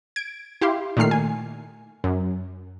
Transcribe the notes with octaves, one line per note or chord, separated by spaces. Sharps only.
G#6 D7
E4 G4 F5 C6
A#2 D#3 A3 F6 C7
G#5
F#2